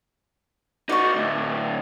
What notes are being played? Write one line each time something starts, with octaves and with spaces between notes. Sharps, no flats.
D#4 F#4 D5 C#6
D2 A2